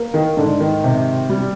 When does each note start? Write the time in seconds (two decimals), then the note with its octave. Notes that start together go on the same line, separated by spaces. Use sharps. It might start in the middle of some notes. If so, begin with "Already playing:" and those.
Already playing: A#3
0.14 D#3
0.37 G#2 D3
0.60 D#3
0.84 C3
1.30 G3